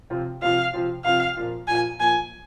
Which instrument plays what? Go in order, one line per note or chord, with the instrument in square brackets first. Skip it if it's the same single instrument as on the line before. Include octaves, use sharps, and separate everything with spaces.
[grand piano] C3 F3 C4 F4
[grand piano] C3 F3 C4 F4 [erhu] F5
[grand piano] C3 F3 C4 F4
[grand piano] C3 F3 C4 F4 [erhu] F5
[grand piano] A#2 F3 A#3 F4
[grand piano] A#2 F3 A#3 F4 [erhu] G#5
[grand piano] A#2 F3 A#3 F4 [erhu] G#5